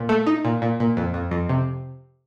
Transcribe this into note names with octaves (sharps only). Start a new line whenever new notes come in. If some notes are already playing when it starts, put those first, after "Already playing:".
Already playing: A#2
A3
D#4
A#2
A#2
A#2
F2
F2
F2
C3